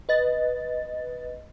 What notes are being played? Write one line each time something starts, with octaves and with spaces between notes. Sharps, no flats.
B4 D#5 A6